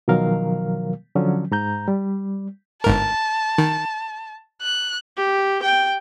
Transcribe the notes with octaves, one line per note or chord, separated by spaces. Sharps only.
B2 D#3 F3 F#3 A#4 F5
D3 F3 F#3 C#4
G#2 A#5 G6
G3
G1 G#2 A#4 A5
D#3
F#6
G4
G5